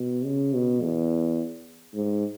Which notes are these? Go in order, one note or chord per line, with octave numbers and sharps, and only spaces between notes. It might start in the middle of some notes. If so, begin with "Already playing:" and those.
Already playing: B2
C#3
B2
E2
G#2